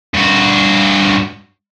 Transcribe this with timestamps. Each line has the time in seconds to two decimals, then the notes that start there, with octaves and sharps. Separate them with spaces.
0.14 G2 F#4